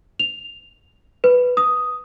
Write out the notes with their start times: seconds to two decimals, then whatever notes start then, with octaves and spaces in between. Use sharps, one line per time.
0.19 F7
1.24 B4
1.57 D#6